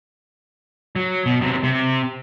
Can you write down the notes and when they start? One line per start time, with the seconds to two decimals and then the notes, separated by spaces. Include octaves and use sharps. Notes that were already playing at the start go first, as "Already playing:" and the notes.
0.96 F#3
1.26 B2
1.41 C3 F#3
1.63 C3